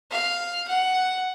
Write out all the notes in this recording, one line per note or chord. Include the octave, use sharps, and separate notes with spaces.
F5
F#5